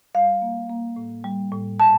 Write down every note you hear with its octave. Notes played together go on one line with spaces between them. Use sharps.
G3 F5
A#3
A#3
A2
G3
A2
A#2 A5